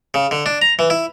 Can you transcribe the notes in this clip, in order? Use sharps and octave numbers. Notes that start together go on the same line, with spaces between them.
C#3
D3
D4
A#5
E3
E4